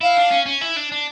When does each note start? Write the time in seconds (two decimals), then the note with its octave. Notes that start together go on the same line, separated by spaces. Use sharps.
0.01 E4 F5
0.17 D4
0.31 C#4
0.46 C#4
0.61 E4
0.76 D4
0.92 D4